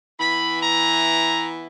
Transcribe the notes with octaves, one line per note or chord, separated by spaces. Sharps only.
E3 B3 E4 B5
A#5